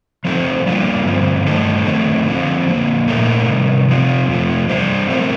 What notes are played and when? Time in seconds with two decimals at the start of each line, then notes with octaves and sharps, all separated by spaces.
0.25 F3 C4 D#4 A4 C5
0.65 G3 A#3 D4 F4
1.06 G2 D3 F3 C4
1.46 G2 D#3 A3 D#4 A4
1.86 F2 D#3 A3 C4
2.26 D3 F3 C4
2.67 D3 F3 A#3
3.08 A#2 A3 D#4 A#4
3.48 C3 D#3 G3
3.88 C3 F3 C4 F4
4.28 F2 C3 F3 A3
4.68 G3 D4 G4 C5
5.09 F3 A3 C4 G4 A#4